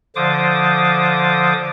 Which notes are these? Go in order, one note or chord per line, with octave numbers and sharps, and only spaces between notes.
D3 F3 C5 D6 D#6